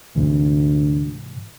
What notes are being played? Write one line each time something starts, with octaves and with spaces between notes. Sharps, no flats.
D2 G#2 C3 E3